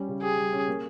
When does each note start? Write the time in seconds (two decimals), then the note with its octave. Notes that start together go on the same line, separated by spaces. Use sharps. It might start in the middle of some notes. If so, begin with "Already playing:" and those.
Already playing: G3 C#4
0.08 C#3
0.23 G4 G#4
0.38 G3
0.52 C#4
0.68 A#3